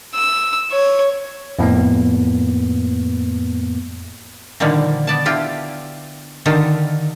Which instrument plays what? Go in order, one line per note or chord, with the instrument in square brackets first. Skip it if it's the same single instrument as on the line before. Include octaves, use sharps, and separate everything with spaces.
[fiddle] E6
C#5
[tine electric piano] F2 A2 A#3 B3
[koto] A#2 D3 D#3 F3 G3 A#3
B3 D5 A5
D3 E4 F4 G4 G5
D3 D#3 D#4 F4 G4 A4